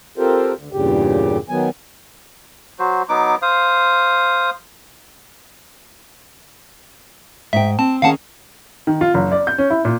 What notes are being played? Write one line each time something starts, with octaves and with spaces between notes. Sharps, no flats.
C4 F4 G4 A4 A#4 C5
D2
E2 G2 A#2 C#3 G4
D#3 F#3 B3 G#5
F#3 F#4 C5
F#3 B3 D#4 D6
C5 F5 D#6
G#2 E5 G5
C4 A5
D#3 C#4 G#4 F5 F#5 A5
D#3
F4
F#1
D5
G6
C#4
E4
A#2